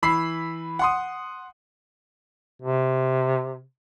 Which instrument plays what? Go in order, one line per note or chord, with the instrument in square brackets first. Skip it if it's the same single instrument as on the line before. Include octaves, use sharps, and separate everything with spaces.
[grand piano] E3 B5 E6 C7
F#5 C6 D#6
[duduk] C3